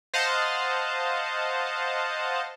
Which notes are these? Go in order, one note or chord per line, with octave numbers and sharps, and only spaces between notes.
C5 D#5 F5 F#5 A5